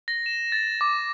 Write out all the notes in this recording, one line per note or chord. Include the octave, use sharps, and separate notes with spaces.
A#6
E7
A6
D6